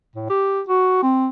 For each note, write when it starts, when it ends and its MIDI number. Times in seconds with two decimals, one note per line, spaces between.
0.15 0.26 45
0.30 0.61 67
0.69 0.98 66
1.03 1.28 60